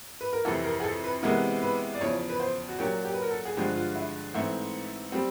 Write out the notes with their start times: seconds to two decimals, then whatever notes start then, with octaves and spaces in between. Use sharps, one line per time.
0.21 B4
0.33 A#4
0.45 F2 C3 E3 A4
0.64 A#4
0.80 G#4
0.84 A4
1.04 B4
1.23 C3 E3 G#3 B3 A#4
1.62 B4
1.95 D5
2.01 E2 C#3 F3 C#5
2.29 B4
2.40 C5
2.69 F#4
2.79 A#2 F#3 A#3 C#4 G4
3.05 G4
3.14 B4
3.22 A#4
3.31 A4
3.45 G#4
3.57 G2 D3 F3 G#3 G4
3.76 F4
3.96 E4
4.34 G#2 E3 A3 C4
5.12 G3 C4